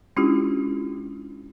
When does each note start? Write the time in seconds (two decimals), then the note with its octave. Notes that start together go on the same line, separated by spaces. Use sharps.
0.16 G#3 C#4 D4 E4 F4 G4